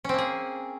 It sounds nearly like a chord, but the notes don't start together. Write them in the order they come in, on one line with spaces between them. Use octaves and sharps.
C#4 C4 A#3 G#4